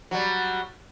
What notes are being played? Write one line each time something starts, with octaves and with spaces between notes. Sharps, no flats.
F#3 G3